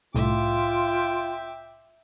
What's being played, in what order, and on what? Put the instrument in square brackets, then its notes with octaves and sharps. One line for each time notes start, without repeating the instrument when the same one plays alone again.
[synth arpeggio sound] C2 A2 [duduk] F4 [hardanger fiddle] E5 D6 [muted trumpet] G5